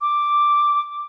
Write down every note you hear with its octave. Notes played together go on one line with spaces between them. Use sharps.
D6